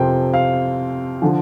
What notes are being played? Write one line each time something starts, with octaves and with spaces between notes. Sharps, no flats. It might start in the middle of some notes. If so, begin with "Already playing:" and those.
Already playing: F2 C3 F3 A#4 C5 G5
F5
D3 F3